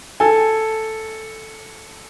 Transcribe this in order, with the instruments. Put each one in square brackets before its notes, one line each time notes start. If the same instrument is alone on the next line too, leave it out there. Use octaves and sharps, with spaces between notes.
[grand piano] A4 G#5